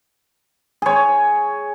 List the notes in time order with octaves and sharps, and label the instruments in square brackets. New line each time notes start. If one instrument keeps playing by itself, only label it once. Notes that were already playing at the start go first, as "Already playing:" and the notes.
[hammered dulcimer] G#4 C#5